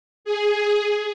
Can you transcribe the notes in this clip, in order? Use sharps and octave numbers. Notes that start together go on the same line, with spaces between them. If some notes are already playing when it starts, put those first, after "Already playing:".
G#4